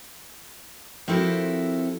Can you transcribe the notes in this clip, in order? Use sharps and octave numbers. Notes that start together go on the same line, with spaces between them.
F3 C4 E4 F#4 A4 A#4